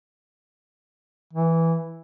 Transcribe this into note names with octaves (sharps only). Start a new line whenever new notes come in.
E3